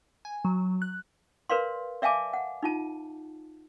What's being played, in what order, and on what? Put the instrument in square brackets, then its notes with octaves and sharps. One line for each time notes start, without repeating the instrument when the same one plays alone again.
[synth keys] G#5
F#3
F#6
[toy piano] A#4 B4 D5 F5 C6
D5 E5 F5 G#5 A5 D6
F#5
D#4 F4 A5